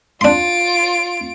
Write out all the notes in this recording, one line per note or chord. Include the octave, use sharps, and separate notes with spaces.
D4 F4 C6 D7